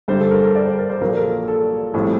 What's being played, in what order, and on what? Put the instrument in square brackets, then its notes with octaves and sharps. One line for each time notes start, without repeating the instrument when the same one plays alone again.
[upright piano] G2 D3 G3 C5
A4
A#4
A4
A#4
D5
C5
A#4
C5
A#1 A#2 F#3 A#3 A#4
A4
A#4
A4
A#1 A2 G3 C4